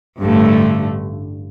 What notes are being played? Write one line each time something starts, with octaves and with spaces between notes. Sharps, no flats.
A1 G2 D3 A3